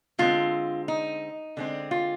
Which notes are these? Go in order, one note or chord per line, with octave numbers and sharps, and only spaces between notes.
D3 G#3 C4 F4
D#4
D3 G#3 C4
F4